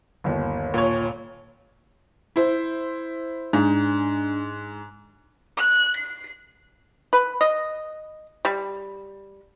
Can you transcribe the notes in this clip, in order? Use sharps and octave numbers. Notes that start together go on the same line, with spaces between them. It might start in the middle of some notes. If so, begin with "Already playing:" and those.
G1 D#2
A#2 C#5
E4 C5
G#2 D4
F#6
C7
B4
D#5
G3